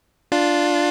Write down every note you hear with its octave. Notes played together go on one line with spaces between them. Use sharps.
D4 F4